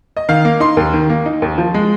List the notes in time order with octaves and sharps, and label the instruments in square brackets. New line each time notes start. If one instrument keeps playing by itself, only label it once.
[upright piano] D#5
D#3 F5
A#3
D#4 C6
D#2
D#3
A#3
D#4
D#2
F3
G#3